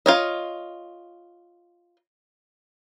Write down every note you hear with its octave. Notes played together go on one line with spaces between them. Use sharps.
F4 C#5 D#5